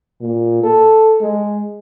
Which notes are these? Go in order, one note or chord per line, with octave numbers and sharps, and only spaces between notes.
A#2
A4
G#3